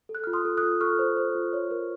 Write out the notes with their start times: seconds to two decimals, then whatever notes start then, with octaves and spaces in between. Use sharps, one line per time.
0.09 A4
0.15 F#6
0.24 F4 F6
0.33 C6 D#6
0.45 A4
0.57 D#6 F#6
0.63 F4
0.81 A4 C#6 F6
0.99 C5
1.17 C5
1.35 F4
1.53 C#5
1.71 A#4